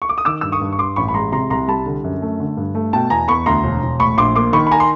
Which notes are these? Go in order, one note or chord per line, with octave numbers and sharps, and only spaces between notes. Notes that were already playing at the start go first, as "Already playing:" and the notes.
C#6
D6
D#6
D#3 D6 E6
G2 E6
C#6 D#6
G2
C#6
G2 C6 D6
A1 B5 C#6
B5
G#3 A#5 C6
C3 A#5 C6
C2 A#5 C6
G3 A5 B5
D3
F#2
A3
D3
G2
A3
B2 G5 A5
E2 G#5 A#5
E2 B5 C#6
D2 A#5 C6
E1
E1
A2 B5 C#6
A#1 C6 D6
A#3 C6 D6
D#3 B5 C#6
B5
G#5 A#5
C6